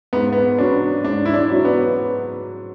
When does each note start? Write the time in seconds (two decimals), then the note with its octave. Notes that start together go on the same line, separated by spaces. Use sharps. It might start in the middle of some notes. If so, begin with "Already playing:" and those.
0.13 G#2 B3
0.32 B3
0.58 F#3 C#4 D4
1.04 G#2 D4
1.26 E4
1.34 D4
1.50 F#3 C#4
1.65 B3